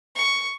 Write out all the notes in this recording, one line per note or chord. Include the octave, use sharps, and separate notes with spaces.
C#6